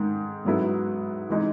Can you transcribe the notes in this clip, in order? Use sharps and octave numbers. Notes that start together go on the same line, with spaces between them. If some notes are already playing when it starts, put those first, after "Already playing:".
Already playing: G#2 D#3 G#3
G#2 F#3 B3 E4
E3 G#3 D#4